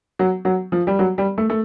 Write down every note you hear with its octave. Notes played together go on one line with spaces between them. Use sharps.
F#3
F#3
F3
G3
F#3
G3
A3
A3